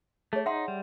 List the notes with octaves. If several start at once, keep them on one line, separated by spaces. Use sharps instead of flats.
A3 G#4 C#5
D#4 E5 F#5 C6
G3